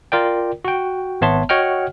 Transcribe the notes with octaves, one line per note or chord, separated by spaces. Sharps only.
F4 A#4 D5 G5
F#4 G5
G#1 B3 C#5 E5 A5 C6
F#4 C#5 D#5 F#5 G5 F6